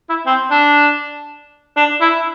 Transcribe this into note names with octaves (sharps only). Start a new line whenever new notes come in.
E4
C4
D4
D4
E4